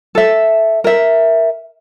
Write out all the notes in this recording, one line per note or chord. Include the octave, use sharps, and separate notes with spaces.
A4 E5
A#4 E5